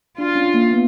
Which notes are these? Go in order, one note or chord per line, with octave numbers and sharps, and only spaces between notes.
D4 F4
C#4
A#3
B3